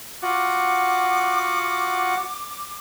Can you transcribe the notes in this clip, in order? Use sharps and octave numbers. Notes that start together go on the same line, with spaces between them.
F4 F#4 F#5 D6